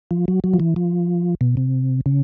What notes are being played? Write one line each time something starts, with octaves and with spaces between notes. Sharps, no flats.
F3
F#3
F#3
F3
E3
F3
B2
C3
C#3